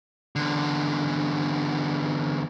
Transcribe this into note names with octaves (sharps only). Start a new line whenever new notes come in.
E2 D3